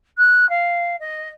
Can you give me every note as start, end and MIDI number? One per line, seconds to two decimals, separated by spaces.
0.18 0.49 90
0.50 0.96 77
1.00 1.29 75